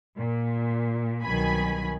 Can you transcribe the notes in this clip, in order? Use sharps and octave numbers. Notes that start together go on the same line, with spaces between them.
A#2
C2 B2 D#3 F#3 G#5 B5